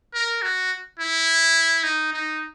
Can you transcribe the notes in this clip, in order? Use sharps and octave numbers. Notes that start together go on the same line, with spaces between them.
A#4
F#4
E4
D#4
D#4